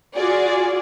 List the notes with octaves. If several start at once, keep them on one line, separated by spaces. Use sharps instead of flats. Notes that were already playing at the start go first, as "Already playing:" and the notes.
F4 F#4 G#4 D5